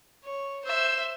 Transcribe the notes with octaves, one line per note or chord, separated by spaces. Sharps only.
C#5
C5 E5